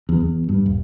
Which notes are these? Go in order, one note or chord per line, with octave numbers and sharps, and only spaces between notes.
E2
E2
G2
D#1